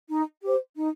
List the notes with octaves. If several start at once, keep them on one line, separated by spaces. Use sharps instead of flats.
D#4
G4 C5
D#4